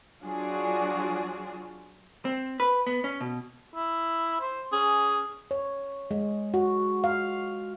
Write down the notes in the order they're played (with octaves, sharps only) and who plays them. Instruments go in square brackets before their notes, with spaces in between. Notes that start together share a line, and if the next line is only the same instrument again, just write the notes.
[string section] F#3 D4 F4 F#4 G#4 D5
[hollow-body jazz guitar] C4
B4
B3
C#4
B2
[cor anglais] E4
C5
[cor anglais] C#4 [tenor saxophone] G#4
[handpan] C#5
G#3
F#4
F5